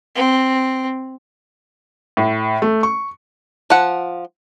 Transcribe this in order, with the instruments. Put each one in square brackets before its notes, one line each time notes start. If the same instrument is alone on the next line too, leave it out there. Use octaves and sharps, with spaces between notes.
[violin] C4
[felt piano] A2
A3
C#6
[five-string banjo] F3 F#5